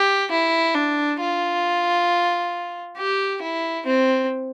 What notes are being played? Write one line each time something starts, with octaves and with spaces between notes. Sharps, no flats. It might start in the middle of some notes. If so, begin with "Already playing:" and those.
Already playing: G4
E4
D4
F4
G4
E4
C4